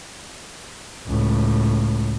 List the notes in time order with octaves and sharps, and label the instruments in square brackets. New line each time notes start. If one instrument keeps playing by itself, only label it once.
[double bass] C#2 A2